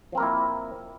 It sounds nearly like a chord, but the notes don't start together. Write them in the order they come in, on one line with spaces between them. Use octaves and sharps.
F3 C4 A#4 A#3 E4